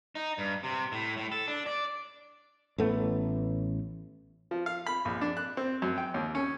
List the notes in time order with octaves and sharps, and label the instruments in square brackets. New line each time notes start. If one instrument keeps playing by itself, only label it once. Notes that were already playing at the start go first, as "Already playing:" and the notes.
[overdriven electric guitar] D#4
G2
C3
A2
A2
A4
D4
D5
[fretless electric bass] A1 A3 B3
[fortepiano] F3
F5
B5
A#1
D4
F#6
C4
F#2
G5
D#2
C#4